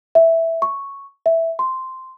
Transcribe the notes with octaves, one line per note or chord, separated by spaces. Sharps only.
E5
C#6
E5
C6